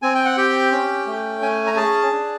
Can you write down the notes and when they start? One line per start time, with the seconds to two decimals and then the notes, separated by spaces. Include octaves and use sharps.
0.02 C4 G#5
0.15 G5
0.25 F#5
0.37 G4 G5
0.72 C#4
1.07 A3
1.41 C#4 G#5
1.67 A#5
1.76 G#4 A5
2.12 D4